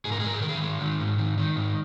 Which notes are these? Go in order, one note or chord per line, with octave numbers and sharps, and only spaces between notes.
G#2 G#4
A#4
G#4
G#2 A#4
G#4
D#3 A#4
G#4
G#3
D#3
G#2
D#3
D#3
G#2